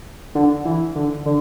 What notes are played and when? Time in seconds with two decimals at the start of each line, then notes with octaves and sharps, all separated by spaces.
0.35 D3
0.65 E3
0.95 D3
1.26 D3